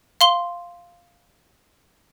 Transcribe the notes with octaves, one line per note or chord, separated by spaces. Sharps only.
F5 C6 G7